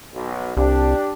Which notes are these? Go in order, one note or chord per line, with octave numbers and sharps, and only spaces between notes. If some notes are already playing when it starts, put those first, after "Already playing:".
B1
C2 D4 G4